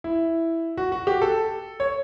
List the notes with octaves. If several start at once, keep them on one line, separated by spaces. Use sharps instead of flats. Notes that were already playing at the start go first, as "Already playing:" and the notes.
E4
F#4
F#4
G4
A4
C#5